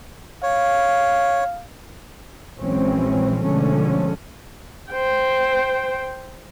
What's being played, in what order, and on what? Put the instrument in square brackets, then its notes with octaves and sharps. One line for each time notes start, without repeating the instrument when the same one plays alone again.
[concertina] C#5 [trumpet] F5
[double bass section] A#1 E3 F#3 G#3 C4 C#4
B2 D3 F3 G#3 A3 C#4
[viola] C5 G5